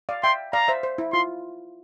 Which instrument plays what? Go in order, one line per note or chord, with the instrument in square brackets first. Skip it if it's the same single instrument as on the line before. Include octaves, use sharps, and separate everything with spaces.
[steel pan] D5 F5
[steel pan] E5 G5 [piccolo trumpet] C6
[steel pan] D5 F5 [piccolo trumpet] A#5
[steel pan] C5 E5
C5
E4
[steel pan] F4 [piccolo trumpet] C6